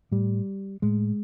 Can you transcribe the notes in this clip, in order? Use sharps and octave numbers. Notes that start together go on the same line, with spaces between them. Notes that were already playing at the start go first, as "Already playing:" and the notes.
A2 G3
A2 G#3